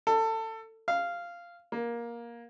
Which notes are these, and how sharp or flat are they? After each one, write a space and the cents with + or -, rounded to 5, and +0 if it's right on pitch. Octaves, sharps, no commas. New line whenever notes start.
A4 +25
F5 -10
A#3 +15